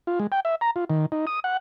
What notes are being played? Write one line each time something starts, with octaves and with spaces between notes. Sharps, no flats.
F4
G#3
G5
E5
A#5
F4
D#3
D#4
D#6
F#5